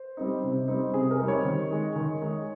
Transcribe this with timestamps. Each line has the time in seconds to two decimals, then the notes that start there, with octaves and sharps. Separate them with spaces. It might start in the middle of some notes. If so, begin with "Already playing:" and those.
Already playing: C5
0.17 G3 C4 D#4
0.43 C3
0.68 G3 C4 D#4
0.94 C3 G#4
1.11 A#4
1.19 G3 C4 D#4
1.28 C#5
1.45 D#3
1.71 G#3 D#4
1.96 D#3
2.21 G#3 D#4